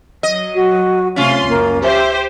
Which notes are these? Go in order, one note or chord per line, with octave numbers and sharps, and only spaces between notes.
F#3 D#5
F#4
C3 A3 C#4 F4 F5 C6
C#2 F#2 A#3
G4 C5 E5